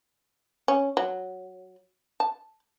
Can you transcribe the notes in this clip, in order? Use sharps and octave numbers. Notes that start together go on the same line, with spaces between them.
C#4
F#3
A5